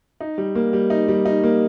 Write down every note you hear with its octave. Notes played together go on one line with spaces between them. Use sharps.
D#4
G3
A#3
G3
D#4
G3
D#4
A#3